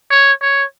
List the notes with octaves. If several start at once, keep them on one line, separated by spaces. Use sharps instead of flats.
C#5
C#5